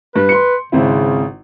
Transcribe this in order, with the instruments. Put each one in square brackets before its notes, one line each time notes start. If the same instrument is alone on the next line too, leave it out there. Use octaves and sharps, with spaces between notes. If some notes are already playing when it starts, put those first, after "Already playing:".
[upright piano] G2 [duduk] B4
[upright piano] C6 C#7
[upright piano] G#1 C4 E4 [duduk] C#3